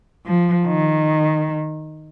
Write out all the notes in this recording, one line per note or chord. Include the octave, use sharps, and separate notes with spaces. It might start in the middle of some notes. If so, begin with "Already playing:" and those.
F3
D#3